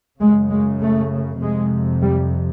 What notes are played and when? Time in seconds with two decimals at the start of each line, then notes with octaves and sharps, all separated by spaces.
0.20 F#2 C#3 G#3
0.50 G#3
0.81 A3
1.42 F2 C3 G#3
2.02 G3